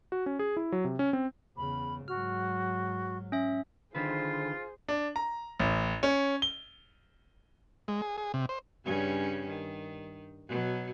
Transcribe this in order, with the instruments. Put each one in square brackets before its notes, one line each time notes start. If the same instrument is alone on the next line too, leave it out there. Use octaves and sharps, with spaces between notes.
[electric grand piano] F#4
C#4
G#4
E4
F#3
C3
C#4
C4
[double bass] E2 C#3 [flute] B5
[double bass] G#2 F#3 [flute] F#4 [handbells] F6
[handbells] C#4 E5
[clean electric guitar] D3 D#3 B4 [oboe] F4 [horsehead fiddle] G#4 C5
[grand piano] D4
A#5
A1
C#4
G7
[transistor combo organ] G#3
G#4
G#4
C3
C5
[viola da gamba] G2 C#3 C#4
D#3
B2 F#3